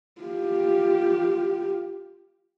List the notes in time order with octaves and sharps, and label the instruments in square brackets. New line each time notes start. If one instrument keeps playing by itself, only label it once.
[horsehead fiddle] F4 G4